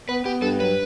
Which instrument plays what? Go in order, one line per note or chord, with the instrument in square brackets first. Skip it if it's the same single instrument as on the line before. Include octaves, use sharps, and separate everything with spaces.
[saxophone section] B3 [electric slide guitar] B4
[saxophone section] B3 [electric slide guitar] G4
[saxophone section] G2 [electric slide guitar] A4
[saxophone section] F#3 [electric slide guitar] B4